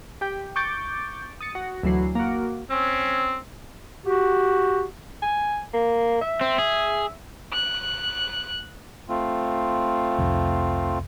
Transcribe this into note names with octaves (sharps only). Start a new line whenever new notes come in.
G4 G5
C#6 D6 G6 A6 D7
D#6 A6 C#7
F#4
D2 E3 F#3 C7
A#3 F#4
C4 C#4
F#4 G4
G#5
A#3
E5
C4
G#4
F#6
A3 C4 F4
C2 F2